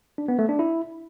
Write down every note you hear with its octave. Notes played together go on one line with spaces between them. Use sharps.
D4
B3
A3
D4
E4